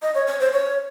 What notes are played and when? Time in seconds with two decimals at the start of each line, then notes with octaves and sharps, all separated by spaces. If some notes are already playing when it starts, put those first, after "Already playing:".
0.02 D#5
0.15 C#5
0.27 C#5
0.40 C5
0.53 C#5